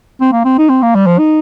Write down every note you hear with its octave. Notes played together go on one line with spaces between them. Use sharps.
C4
A#3
C4
D#4
C4
A#3
G3
F3
D#4